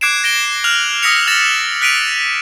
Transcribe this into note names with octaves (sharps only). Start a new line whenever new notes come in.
D6 F#6 G#6 C7 D7 E7
A#6 D7 E7 G7
F6 F#6 F7 F#7
D#6 E6 A#6 B6 C#7 F7
F6 A6 A#6 E7 F#7
F#6 B6 D7 D#7 F7